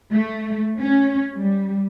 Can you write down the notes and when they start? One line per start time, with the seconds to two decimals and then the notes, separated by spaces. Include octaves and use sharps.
0.13 A3
0.79 C#4
1.38 G3